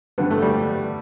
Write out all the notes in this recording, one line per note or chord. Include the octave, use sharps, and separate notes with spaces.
G2 D3 B3
A3
G3